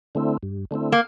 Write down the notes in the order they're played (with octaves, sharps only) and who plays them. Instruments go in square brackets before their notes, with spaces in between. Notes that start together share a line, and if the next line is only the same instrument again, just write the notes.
[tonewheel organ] D3 A3 C4 E4
G2
D3 A3 C4 E4
[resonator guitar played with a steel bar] A#3